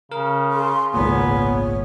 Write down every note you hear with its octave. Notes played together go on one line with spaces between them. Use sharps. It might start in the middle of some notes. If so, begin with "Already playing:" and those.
C#3 A#4
G#4 C6
G#1 C#2 A#2 B3 C#5